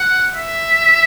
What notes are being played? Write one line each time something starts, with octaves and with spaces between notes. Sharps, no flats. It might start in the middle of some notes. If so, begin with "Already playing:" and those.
Already playing: F#5
E5